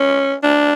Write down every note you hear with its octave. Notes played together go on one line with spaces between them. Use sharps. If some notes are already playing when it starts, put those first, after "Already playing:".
Already playing: C#4
D4